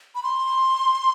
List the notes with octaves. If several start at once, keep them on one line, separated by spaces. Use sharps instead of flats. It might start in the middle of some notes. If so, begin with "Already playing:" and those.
B5
C6